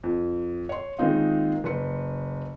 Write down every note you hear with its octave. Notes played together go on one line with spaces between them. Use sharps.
F2
C#5 C6
D#3 G#3 A#3 C4 D#4 F4
F#1 B4 C6 C#7